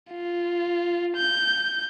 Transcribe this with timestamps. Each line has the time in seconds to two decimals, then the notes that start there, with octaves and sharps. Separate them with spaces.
0.11 F4
1.16 G6